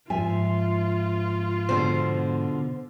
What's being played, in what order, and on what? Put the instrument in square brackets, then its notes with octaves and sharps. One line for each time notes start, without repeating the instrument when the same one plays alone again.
[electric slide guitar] G#2 F3 [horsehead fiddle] F4 [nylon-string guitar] E5 G#5
[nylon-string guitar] B2 D3 [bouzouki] C5